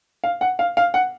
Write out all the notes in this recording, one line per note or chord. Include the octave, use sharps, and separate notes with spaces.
F5
F#5
F5
F5
F#5